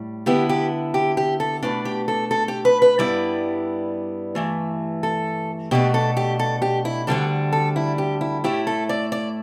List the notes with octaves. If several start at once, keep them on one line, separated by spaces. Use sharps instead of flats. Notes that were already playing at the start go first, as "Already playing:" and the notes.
Already playing: A2 G3
D3 B3 E4 G4
G4
G4
G4
A4
B2 A3 D4 B4
G4
A4
A4
G4
B4
B4
G2 G3 B3 E4 D5
G2 E3 A3
A4
B2 A3 D4 G4
A4
G4
A4
G4
E4
D2 D3 G3 D4 A4
A4
E4
G4
E4
A2 A3 E4 G4
A4
D5
D5